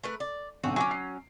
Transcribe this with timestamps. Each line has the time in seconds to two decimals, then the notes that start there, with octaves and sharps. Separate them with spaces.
0.04 A3 A#4 B4
0.20 D5
0.63 B1 D3 C4 C#4 F#4
0.76 F#3 C#4 G#5 C#6 D6
0.91 C7